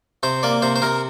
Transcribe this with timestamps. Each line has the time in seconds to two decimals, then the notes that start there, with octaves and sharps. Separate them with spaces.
0.23 C3 C5
0.43 A#3 D5
0.62 C3 C5
0.76 C5
0.82 C3 A#4